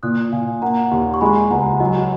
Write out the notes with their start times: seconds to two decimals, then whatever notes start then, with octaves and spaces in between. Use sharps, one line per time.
0.03 A#2 D#6 F#6
0.32 A#2 F5 G#5
0.62 A#3 F#5 A#5
0.91 D#2
1.14 C#6
1.21 G#3 G#5 B5
1.51 C#2 F#5 A#5
1.80 F#3 D#5